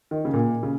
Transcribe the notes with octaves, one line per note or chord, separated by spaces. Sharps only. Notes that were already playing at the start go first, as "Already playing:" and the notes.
D#3
C#3
A#2
C#3